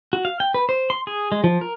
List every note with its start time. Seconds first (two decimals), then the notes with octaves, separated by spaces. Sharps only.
0.13 F#4
0.25 F5
0.40 G5
0.54 B4
0.69 C5
0.90 C6
1.07 G#4
1.32 G#3
1.44 F3
1.61 A#4